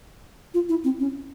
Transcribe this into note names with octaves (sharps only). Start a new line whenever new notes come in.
F4
E4
C4
C#4